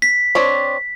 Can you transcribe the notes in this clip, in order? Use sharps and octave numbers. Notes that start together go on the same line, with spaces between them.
B6
C4 D4 C#5